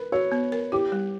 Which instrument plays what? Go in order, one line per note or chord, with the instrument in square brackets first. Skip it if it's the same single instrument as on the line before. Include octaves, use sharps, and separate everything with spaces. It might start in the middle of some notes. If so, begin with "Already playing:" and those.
Already playing: [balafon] A#4 [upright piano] B4
[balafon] F#4 [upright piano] C#5
[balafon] B3
A#4
[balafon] E4 [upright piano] G4
[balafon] G3